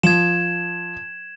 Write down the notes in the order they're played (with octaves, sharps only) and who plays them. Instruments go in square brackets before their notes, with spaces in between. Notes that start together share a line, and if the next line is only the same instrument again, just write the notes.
[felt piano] F3 [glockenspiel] G#6 E7